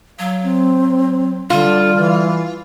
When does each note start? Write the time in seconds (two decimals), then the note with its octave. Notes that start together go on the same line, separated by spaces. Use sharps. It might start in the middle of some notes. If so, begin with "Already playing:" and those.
0.19 F#3 F5
0.43 C4
1.50 D3 G3 F4
1.96 E3